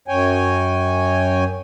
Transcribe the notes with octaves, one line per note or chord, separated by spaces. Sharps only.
F#2 C#5 G5 G#5